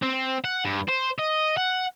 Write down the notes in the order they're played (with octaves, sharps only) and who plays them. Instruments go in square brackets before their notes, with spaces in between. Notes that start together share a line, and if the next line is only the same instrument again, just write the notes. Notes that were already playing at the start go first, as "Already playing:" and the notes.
[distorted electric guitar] C4
F#5
G2
C5
D#5
F#5